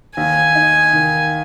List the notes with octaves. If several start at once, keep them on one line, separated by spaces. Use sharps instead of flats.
D#2 G#5
D#4
D#3